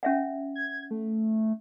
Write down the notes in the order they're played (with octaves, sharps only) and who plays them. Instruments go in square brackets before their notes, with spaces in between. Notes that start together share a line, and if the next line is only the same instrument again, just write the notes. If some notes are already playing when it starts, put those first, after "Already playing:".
[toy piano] C#4 E5 F#5
[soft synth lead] G#6
A3